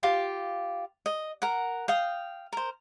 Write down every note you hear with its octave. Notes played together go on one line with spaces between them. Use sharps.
F4 G4 F5 D6
D#5
A#4 F#5
F5 G5 D#6
A#4 C5